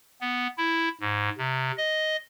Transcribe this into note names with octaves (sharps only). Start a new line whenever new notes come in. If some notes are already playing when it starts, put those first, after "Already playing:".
B3
E4
G#2
C3
D#5